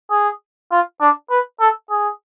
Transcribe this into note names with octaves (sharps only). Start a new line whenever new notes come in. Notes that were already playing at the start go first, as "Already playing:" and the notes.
G#4
F4
D4
B4
A4
G#4